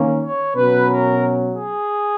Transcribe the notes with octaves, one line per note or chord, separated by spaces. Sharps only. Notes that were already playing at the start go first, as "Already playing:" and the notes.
Already playing: D#3 A#3 C#4
C#5
B2 F#3 C#4 B4
A#4
G#4